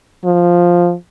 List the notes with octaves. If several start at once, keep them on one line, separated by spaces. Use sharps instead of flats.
F3